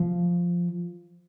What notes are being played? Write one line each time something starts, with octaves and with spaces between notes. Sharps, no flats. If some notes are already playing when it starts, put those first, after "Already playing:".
Already playing: F3